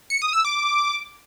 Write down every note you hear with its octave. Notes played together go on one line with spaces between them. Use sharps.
C#7
D#6
E6
D6